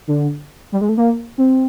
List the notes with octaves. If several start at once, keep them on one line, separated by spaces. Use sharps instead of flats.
D3
G3
G#3
A3
A#3
C4